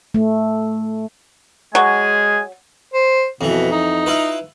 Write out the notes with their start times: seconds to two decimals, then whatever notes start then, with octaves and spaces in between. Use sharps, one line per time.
0.14 A3
1.75 F#3 G#3 G#4 G#5
2.94 C5
3.41 F2 B2 E3
3.71 D#4
4.06 E4 F4 B4